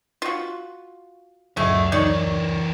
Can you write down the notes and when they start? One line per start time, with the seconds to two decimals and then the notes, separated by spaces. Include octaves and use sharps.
0.22 F4 F#4
1.57 D1 C#2 F#2 G#3 A3 E5 F#5
1.92 E3 D#4 A#4 C#5 D5